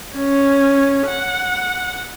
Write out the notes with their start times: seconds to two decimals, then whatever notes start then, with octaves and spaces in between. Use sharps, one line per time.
0.16 C#4
1.07 F#5